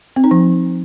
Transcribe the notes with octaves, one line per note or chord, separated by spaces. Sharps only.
C4
D#4
F3